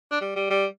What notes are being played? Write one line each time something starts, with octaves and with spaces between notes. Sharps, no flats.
D4
G3
G3
G3